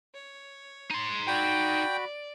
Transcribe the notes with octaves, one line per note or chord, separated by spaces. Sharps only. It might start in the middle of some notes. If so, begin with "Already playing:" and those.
C#5
D#4 C6
F#4 D5 G5 B5